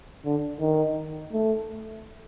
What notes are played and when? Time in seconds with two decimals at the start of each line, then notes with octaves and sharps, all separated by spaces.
0.25 D3
0.60 D#3
1.32 A3